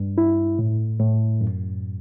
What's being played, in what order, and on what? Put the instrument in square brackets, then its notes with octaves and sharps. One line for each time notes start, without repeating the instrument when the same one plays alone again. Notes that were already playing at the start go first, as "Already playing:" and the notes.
Already playing: [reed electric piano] G2
E4
A2
A2
F#2